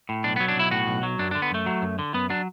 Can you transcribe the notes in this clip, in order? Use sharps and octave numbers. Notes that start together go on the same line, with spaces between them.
A2
B1 D4
B3
F#3
D4
B1 E4
A2 F#4
B1
F#3
F#2 D4
D4
D3
B3
F#2 A3
F#3
F#2
D3
F#2 B3
F#3 D4